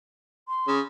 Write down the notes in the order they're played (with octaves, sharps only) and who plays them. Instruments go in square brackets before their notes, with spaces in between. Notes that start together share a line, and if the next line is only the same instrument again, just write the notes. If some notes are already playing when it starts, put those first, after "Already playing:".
[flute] C6
[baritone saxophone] C#3